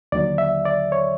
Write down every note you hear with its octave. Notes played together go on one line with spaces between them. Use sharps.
D#2 D3 F#3 D5
E5
D5
C#5